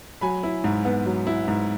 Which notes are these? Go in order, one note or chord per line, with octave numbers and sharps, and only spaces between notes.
F#3 G#5 B5
E4
G#2
B3
F#3
E4
G#2